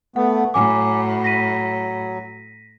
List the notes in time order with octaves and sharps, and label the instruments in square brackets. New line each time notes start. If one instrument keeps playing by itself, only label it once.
[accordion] A3 B3 [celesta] F#5
[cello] A2 [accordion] F#3 [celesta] G#5 D6
[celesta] A#6 B6 D#7